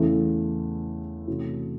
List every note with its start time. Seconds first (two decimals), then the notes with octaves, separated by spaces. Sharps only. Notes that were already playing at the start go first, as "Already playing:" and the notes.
Already playing: E2 C#3 E3 A3
1.27 C3 E3 A3 C#4 F#4